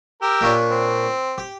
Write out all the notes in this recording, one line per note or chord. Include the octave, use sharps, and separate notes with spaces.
G4 A#4 E6
A#2 C#4 D4
C4
G4